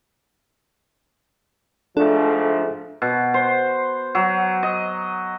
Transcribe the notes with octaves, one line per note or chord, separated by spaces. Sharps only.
G#2 F3 A3 D4 A4
B2
C5
F#3
D#5